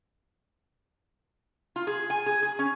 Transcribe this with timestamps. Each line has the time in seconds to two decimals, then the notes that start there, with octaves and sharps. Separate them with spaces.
1.76 F4
1.87 G#4
2.10 G#5
2.26 G#4
2.43 G#4
2.59 C#4